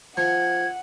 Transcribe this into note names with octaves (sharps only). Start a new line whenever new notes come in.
F3 F#5 G#6